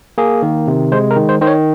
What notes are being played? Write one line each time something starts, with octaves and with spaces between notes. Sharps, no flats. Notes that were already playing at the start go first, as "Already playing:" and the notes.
A#3 G#4
D#3
C3
G#3 C5
A#4
D#3
C5
D#3 C5
C#5